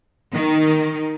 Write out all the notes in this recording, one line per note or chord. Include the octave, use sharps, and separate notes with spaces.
D#3